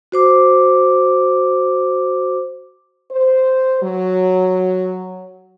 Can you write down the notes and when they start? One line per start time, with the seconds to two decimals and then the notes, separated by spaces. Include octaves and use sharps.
0.12 F#4 C5 D6
3.12 C5
3.82 F#3